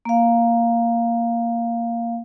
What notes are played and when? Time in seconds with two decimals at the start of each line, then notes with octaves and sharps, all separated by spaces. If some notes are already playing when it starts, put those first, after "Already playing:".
0.05 A#3 F5